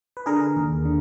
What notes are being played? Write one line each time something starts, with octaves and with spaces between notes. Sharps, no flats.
B4
D3 G#4 A#4
D#2
D3